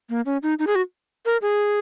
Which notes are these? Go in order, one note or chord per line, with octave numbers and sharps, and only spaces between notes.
A#3
C#4
D#4
D#4
G#4
F#4
A#4
G#4